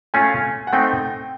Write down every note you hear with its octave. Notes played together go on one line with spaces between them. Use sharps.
A3 C#4 F4 G#5
F#5
A3 C4 D#4 G5